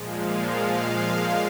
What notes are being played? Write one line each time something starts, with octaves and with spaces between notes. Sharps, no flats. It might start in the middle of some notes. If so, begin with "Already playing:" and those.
Already playing: A#2 F3 G#3
F5
F5